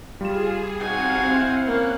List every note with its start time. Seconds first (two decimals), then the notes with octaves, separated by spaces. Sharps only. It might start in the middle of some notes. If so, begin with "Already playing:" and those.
0.21 G3 F4 G#4 E7
0.80 C4 D#4 F#4 F5 F#5 G#5
1.29 E4 C5
1.66 A#3 C#4 F#6